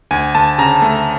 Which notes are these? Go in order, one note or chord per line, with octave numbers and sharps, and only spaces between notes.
D2 G#5
D2 A5
C#3 A#5
A3